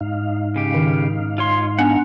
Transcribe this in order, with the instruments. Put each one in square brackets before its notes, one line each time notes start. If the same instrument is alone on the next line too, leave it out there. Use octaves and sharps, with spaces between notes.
[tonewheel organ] G#2 D#4 F5
[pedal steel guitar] C#3 G4
[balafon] D#3
[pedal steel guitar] F4 C#5 C6
[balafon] B3 D4 G#5 [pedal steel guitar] F#5 A#5